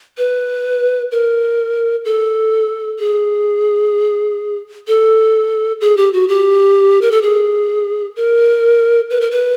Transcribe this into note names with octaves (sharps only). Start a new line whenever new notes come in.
B4
A#4
A4
G#4
A4
G#4
G4
F#4
G4
A#4
A4
G#4
A#4
B4
A#4
B4